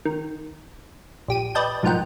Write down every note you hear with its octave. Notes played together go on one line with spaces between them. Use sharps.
D#3
A#1 G4 D#7
B4 D5 D#5 G5 A5 G6
B1 G#2 F3 A#4 F#5 G5